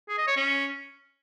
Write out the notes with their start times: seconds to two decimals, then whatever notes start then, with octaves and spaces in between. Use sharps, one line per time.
0.09 G#4
0.18 D#5
0.27 C#5
0.36 C#4